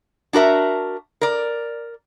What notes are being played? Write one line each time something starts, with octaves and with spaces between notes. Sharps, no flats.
D4 F#4 A#4 E5
A#4 D5